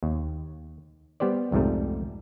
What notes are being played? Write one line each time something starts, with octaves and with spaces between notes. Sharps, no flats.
D#2
G3 B3 G4 C5 D5
C2 F2 G#2 G3 A3